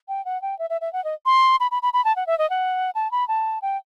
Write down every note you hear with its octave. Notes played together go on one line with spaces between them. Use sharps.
G5
F#5
G5
E5
E5
E5
F#5
D#5
C6
B5
B5
B5
B5
A5
F#5
E5
D#5
F#5
A5
B5
A5
G5